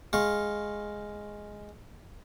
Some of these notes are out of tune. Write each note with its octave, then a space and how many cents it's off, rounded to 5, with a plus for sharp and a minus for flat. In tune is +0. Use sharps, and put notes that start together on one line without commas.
G#3 +0 F5 +0 C#6 -25